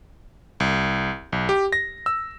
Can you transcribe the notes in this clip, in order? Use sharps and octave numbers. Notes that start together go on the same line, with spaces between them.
C2
B1
G4
A#6
E6